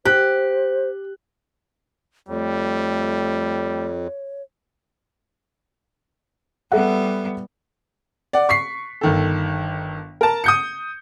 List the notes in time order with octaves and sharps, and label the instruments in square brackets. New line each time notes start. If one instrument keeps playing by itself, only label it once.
[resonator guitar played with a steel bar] G4 [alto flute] C5 [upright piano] F#6
[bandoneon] F2 [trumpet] G3 [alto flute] A3 [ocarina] C#5
[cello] G3 B3 [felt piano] A4 E5 F#5
[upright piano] D5 F#5
C#6 B6 C7
G1 D#3 A4
A#4 A5
D#6 G6 C#7